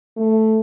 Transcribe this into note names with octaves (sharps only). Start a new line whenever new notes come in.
A3